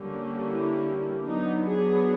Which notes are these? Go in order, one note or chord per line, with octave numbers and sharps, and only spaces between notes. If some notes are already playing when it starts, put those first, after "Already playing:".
Already playing: D3 G3 A#3 C#4
E4
F#3 B3 D4 D#4
G#4